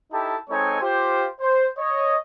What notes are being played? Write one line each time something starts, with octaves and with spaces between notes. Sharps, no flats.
D#4 E4 G4 A4 A5
G#3 C4 D#4 A4 C#5 G#5
F4 G4 C5
C5
C#5 D#5